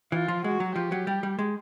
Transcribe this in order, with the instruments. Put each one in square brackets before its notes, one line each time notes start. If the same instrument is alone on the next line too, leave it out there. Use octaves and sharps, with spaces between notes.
[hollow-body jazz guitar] E3 [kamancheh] F4
[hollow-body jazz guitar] F3
[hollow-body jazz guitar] G#3 [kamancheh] F#4
[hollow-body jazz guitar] F#3
[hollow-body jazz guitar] F3 [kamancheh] G4
[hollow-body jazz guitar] F#3
G3
G3
G#3